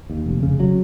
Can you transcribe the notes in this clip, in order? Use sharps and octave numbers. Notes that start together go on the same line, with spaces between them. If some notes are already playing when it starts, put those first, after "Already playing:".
D#2
F1
C#3
F#3